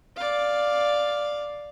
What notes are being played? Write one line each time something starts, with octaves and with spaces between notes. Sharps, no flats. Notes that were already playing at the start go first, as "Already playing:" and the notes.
D5 F5